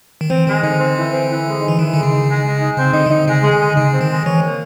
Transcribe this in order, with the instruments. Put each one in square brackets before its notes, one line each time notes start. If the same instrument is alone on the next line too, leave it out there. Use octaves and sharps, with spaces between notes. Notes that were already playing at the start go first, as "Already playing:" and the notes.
[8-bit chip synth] D#3
[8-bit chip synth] E3 [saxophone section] C4
[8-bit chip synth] D#3 [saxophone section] G#3
[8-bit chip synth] D3 [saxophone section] D#4
[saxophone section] C4
E3
C4
E3
G#3
D#4
[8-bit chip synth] E3
[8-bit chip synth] D#3 [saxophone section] E3
[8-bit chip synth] D3 [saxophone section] G#3
[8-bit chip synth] C#3
[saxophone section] D#4
G#3
G#3
D#4
[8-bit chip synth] C#3 [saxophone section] C4
[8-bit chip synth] D3 [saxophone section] D#4
[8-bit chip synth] D#3
[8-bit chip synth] D3 [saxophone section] D#4
[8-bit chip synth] C#3 [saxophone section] G#3
[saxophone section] G#3
[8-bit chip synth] D3
[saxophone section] G#3
[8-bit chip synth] C#3 [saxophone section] D#4
[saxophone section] C4
[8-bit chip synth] D#3
[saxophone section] G#3
[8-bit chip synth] E3 [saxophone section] C#5
[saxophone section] A#3